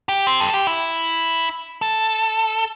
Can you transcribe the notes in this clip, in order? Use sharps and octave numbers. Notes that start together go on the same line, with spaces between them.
G4
C5
A4
G4
E4
A4